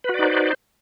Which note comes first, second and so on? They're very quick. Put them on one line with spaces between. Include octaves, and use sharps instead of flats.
B4 F#4 D5 D#4 C5